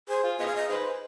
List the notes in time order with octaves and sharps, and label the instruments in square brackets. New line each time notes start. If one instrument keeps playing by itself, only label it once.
[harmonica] G#4 [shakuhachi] C5
[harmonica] F4
[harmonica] B3 F4 G#4 [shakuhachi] D#5
[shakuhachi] F5
D#5
[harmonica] D#4 G#4 B4 [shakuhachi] C5